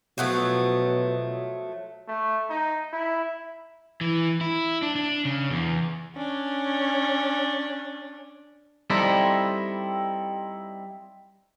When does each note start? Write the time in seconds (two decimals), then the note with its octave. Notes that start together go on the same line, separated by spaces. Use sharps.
0.18 B2 F3 F#3 A3
2.08 A3
2.49 D#4
2.93 E4
4.01 E3
4.41 E4
4.82 D4
4.96 D4
5.25 C#3
5.50 E2
6.16 C#4 D4
8.90 G3 C4 D#4 E4 A4